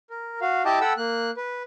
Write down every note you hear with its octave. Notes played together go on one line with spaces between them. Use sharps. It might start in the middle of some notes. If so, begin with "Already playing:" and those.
A#4
F#4 F5
E4 G4 D#5 G5 A5 D6
A4 F#5 G5 B5 E6
A#3 F#6
B4